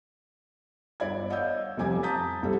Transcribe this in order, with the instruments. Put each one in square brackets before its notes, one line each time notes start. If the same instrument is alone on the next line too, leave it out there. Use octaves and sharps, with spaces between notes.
[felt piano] G1 D5 B5 G#6
C#5 D#5 F5 F#5 E6 G6
F1 F2 G3 G#5 D6 G#6
A5 A#5 D#6 G6 A6 B6
F1 C2 G3 A4